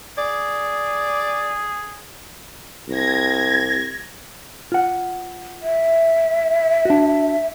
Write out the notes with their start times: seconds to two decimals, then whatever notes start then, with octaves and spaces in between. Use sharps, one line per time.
0.18 G#4 D5
2.88 C2 G#6 A#6
4.72 F4 F#5
5.62 E5
6.85 D4 F#4